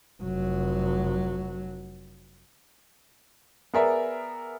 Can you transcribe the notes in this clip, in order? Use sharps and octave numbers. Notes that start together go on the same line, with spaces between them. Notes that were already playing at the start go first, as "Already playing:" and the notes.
F1 F#3
B3 G#4 A#4 D5 E5